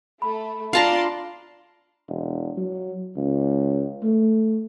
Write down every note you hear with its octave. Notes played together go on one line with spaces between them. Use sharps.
A3 B5
D4 F4 D5 F5 A5 A#5 C6
E1
F#3
C#2
A3